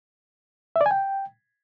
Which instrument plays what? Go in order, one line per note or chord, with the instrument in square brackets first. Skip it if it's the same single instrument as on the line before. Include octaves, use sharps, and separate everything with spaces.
[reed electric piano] E5
D5
G#5
G5